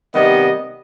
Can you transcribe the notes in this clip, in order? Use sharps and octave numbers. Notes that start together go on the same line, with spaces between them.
C3 D#3 G3 B3 D#5